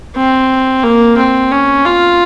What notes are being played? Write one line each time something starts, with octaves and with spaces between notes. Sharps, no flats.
C4
A#3
C4
C#4
F4